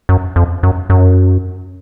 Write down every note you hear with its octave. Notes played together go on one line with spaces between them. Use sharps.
F#2
F2
F#2
F#2